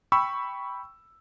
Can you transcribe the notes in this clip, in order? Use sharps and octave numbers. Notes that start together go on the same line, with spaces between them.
G5 B5 C#6 E6